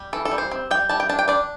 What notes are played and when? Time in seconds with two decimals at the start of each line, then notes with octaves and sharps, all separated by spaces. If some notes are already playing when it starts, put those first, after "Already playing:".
Already playing: G3
0.13 E3 A4
0.25 A4
0.31 G3
0.38 C5
0.51 C4
0.71 G3 G5
0.89 G3 A5
1.00 G5
1.09 D4 A5
1.19 G5
1.28 D4 D5